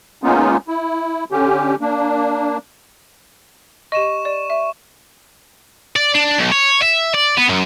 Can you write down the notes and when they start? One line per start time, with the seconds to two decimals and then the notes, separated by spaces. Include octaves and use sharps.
0.23 G#3 A#3 B3 C#4 D#4 F4
0.68 E4
1.32 D3 C#4 G4
1.81 A#3 D4
3.92 G4 D#5 C#6 D#7 E7
4.25 D5
4.50 E5
5.96 D5
6.14 D4
6.38 B1
6.51 C#5
6.82 E5
7.14 D5
7.37 B3
7.49 F#2